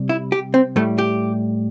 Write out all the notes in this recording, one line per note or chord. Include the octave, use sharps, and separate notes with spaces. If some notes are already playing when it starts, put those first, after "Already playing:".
Already playing: C3 G3
E4
G4
C4
A2 G3 A3
G4